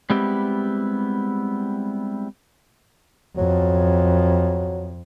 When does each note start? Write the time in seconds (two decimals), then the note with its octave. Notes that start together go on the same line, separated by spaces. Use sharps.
0.10 G3 G#3 B3 C4 E4 G4
3.38 F2 F#3